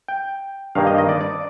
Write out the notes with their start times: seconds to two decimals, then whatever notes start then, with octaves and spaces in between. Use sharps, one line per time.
0.08 G5
0.75 G2 D#3 A#3 F5
0.87 D#5
0.98 D#5
1.09 D5
1.21 D5